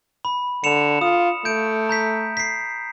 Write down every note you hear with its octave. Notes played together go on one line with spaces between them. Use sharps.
B5
D3 C#7 E7 F7
F4 D#6
A3 G6 D7
A#5 G6 B6
B6 C7